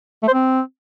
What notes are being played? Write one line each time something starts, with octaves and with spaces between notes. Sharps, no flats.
A3
C5
C4